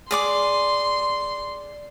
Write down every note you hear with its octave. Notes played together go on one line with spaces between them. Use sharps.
G#4 D5 C6 D6